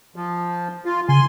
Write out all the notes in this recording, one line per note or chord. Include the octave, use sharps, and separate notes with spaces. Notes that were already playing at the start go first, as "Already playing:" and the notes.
F3
F4
C#3 G#5 C6